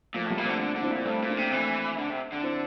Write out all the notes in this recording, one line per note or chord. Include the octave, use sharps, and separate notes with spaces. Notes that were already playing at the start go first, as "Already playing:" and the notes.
A#2 F3 A3
A2 G3 A#3
A#2
D3 A3 C4
D3
D3
C4 E4
A#2
G2 A3 C4
A#2
A#3 D4
C3
E3 A3 C4
D3
C3
D3
C4 E4